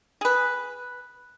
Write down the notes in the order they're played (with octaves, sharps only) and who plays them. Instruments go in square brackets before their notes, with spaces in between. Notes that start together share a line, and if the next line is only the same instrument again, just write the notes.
[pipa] G#4 B4